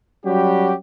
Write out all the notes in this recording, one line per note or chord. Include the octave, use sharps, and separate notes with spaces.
F#3 G3 C#4 F#4 G4